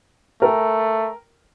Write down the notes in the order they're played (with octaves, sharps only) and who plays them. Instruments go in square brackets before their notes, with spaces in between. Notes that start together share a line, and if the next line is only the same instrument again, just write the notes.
[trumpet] A3 [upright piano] A#4 G5 A#5